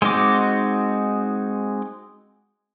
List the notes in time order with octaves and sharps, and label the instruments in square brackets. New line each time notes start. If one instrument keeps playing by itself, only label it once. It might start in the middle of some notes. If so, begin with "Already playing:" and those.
[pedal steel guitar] G#3 C4 D#4 F#4 D6